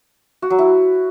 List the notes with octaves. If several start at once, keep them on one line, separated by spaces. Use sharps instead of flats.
F#4
F#3
E4